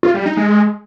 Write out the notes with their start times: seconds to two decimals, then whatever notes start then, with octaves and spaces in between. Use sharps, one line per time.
0.03 F4
0.14 G3
0.26 D#4
0.37 G#3